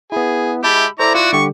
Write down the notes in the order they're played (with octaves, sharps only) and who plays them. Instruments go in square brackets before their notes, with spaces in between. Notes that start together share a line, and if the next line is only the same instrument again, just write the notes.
[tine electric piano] B3 E4 [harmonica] G#4
[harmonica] G#3 B5 E6 [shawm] G4 [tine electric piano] E5 A5
[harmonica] E4 D5 D6 [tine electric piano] A4 C5 [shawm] A#5
[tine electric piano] F4 F#6 [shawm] F#4
[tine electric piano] D3 G3 G4 [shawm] C#6